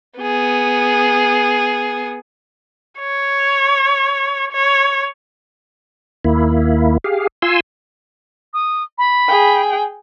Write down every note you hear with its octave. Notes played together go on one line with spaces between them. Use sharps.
B3 G#4
C#5
C#5
D#2 A#3 E4
G4 G#4 F5
F4 G#5 C6 E6
D#6
B5
G#4 G5